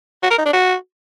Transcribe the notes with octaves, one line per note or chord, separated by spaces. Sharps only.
F#4
A#4
D#4
D4
F#4